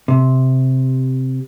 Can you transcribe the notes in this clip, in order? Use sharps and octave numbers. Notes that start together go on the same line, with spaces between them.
C3